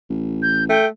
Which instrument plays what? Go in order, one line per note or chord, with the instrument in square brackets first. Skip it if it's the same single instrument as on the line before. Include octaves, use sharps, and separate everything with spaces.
[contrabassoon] A1
[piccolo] G6
[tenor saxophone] A3 [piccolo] G5